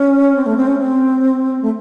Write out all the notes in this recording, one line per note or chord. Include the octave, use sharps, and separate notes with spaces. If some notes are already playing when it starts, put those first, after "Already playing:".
Already playing: C#4
C4
A3
C4
C#4
C4
A3